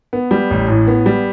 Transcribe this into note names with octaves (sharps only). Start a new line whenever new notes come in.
B3
G3
A1
A2
B3
G3